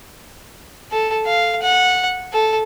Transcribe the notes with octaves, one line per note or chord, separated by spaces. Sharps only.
A4
F5
F#5
A4